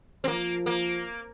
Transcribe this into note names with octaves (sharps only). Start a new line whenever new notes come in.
C4
F3 A#3
A#3